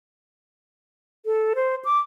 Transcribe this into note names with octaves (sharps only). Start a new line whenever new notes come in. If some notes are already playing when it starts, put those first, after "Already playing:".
A4
C5
D6